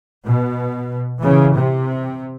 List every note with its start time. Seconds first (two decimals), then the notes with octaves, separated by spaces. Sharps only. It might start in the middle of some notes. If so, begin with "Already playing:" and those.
0.24 B2
1.21 C#3 E3
1.56 C3